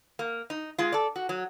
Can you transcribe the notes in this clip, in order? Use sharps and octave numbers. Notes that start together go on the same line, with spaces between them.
A#3
D#4
G#3 F4
A4 D5
F#4
F#3